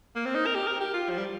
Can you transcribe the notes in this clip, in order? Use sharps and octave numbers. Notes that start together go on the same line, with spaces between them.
A#3
C4
D#4
A#4
G4
A#4
G4
F4
F3
G3